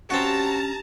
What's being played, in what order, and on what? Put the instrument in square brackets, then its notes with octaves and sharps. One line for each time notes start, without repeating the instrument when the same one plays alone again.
[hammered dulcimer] G2 G4 [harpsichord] C4 F#4 [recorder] C#4 [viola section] A5 A#5